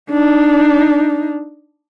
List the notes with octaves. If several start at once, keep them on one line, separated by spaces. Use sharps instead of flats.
D4 D#4